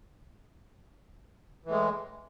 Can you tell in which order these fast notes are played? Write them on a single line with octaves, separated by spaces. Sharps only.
E3 A2 G#3